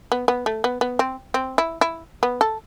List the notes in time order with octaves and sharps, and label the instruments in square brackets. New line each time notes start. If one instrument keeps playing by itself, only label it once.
[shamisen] B3
B3
A3
B3
B3
C4
C4
E4
E4
B3
A4